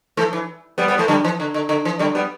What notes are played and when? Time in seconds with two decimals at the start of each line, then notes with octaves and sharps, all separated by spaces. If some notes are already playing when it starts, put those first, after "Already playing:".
0.17 E3 A3
0.33 E3
0.78 G3 B3
0.88 G3 B3
0.98 E3 A3
1.08 D3 G3
1.25 E3
1.40 D3
1.54 D3
1.69 D3
1.85 E3
1.99 D3 G3
2.15 G3 B3